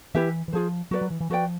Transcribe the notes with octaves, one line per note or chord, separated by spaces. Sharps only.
E3 E4 G4 B4 E5
E3
F3 F4 G#4 C5
F#3 F#4 B4 D5
F#3
E3
E3
F3 F#4 B4 D5 G5